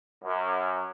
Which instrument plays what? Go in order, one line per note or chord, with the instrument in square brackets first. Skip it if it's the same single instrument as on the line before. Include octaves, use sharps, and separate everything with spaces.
[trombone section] F#2